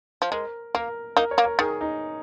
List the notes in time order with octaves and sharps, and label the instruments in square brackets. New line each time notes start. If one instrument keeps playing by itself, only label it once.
[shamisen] F3
[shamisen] G#3 [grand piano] A#4
[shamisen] A#3 [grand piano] A#4
[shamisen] A#3 D#4 [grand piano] A#4
[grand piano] C#5
[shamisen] A#3
[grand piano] A#4
[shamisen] D#3 [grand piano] G#4
[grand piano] D#4